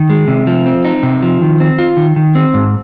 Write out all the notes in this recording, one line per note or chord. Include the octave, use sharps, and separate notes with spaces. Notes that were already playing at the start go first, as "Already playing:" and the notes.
Already playing: D#3
G#3
C3
F3
C4
D#4
C3
F3
D#3
C4
F4
D#3
D#3
C4
G#2